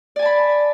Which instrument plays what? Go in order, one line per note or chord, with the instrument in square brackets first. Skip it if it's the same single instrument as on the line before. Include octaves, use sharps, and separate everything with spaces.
[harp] D5
G#5
A5
B5